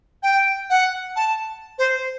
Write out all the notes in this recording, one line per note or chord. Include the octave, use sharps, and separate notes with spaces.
G5
F#5
A5
C5